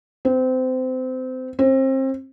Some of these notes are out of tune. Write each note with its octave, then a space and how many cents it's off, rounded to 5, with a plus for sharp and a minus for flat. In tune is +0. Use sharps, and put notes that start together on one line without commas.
C4 -25
C4 +30